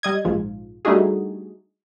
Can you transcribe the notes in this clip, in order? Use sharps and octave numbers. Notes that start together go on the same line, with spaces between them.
G3 D#5 G#6
A#1 G#2 F3
G3 A3 D4 D#4 F#4 G#4